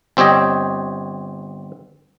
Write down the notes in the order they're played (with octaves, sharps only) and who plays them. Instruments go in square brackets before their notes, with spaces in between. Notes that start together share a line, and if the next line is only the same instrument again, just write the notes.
[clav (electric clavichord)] G1 C4 G4 C#5 D#5